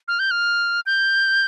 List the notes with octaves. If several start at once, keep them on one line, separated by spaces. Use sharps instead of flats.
F6
G6
F6
G6